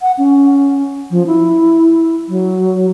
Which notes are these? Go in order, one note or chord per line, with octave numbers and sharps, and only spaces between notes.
F#5
C#4
F3
E4
F#3